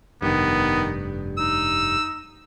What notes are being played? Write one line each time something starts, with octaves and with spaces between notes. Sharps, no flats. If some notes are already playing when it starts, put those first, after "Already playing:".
F1 G2 D#3 B3
D#4 E6